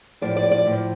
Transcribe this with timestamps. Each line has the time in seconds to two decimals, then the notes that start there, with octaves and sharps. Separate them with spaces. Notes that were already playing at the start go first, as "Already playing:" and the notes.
0.21 A2 F3 D5
0.36 D5
0.51 D5
0.66 A2 F3